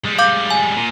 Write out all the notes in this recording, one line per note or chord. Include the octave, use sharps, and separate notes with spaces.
G3 G#3
F5 D6 G6
G#5
A#2